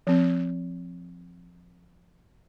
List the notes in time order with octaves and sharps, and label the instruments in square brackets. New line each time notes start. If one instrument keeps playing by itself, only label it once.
[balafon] F3 C4